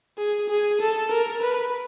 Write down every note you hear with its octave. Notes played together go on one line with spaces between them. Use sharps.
G#4
G#4
A4
A#4
B4